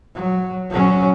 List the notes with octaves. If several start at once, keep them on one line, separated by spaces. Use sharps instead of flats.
F#3
F#3 C#4